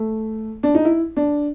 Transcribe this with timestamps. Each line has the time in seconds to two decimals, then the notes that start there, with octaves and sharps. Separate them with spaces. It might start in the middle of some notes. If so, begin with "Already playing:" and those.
Already playing: A3
0.63 D4
0.75 D#4
0.85 E4
1.17 D4